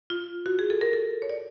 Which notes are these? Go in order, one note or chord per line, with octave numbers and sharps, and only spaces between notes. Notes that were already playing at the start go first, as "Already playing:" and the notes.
F4
F#4
G#4
A4
A#4
A4
C#5
D5